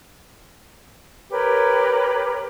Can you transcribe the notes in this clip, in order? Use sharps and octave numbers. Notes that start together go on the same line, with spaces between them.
G4 A#4 B4 C#5